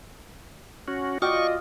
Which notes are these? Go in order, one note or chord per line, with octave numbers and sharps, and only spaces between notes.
C#4 F#4
F4 F#4 D5 D#5 G5 C#6 D#6 F6